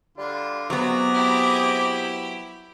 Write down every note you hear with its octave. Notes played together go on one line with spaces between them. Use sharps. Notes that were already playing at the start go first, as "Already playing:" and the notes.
D3 G3 F4
C3 F#3 B3 G#4 A#5 D6
E4 G4